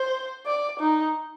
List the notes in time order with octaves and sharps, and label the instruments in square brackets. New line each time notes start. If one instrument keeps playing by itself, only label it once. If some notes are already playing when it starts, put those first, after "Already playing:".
Already playing: [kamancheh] C5
D5
D#4